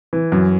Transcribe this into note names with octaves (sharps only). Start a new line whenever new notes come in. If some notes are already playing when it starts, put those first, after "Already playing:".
E3
F#2